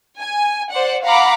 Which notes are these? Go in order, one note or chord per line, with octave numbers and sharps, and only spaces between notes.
G#5
C5 D5 F#5
F5 F#5 A#5 B5 D6